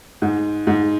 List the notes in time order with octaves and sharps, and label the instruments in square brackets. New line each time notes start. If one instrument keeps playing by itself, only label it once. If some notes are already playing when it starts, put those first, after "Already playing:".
[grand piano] G#2
G#2